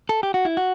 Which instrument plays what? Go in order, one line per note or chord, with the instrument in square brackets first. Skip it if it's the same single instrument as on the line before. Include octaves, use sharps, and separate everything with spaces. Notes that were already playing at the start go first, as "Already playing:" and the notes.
[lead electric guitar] A4
G4
F#4
E4
F#4